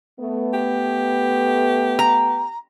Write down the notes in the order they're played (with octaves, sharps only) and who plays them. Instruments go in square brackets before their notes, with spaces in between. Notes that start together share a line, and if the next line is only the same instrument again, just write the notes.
[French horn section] A3 B3
[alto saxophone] G4
[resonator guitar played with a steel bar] A#5